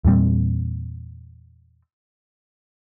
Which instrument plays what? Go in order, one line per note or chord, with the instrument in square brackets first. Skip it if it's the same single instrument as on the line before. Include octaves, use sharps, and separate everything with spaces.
[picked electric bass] E2 A#2 G3 C4